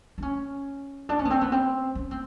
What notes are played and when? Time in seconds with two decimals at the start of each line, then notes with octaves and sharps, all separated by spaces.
0.18 D4
0.22 C#4
1.09 D4
1.19 C#4
1.25 B3
1.30 C4
1.41 B3
1.52 C4
1.95 C#4
2.11 C4